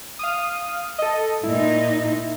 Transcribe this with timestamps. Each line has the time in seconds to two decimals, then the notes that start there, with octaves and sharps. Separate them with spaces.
0.19 F5 D#6
0.99 A4 D#5
1.43 A#2 D#4 E4